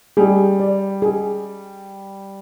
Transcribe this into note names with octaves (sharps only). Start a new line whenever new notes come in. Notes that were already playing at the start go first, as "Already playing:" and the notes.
G3 G#4
D5
G#4